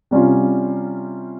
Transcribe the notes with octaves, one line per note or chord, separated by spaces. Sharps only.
C3 G3 C#4 F4